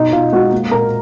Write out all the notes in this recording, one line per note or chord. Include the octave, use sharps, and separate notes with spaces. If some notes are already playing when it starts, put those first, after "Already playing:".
Already playing: B2 D#4 D#5
B2 F4 F5
G#3 F#4 F#5
A#3
A#2 A#4 A#5